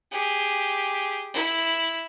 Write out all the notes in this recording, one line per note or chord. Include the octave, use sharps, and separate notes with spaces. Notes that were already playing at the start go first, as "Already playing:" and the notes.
G4 G#4
E4